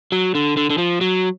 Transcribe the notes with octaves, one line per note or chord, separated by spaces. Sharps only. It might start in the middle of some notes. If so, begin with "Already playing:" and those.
F#3
D3
D3
D3
F3
F#3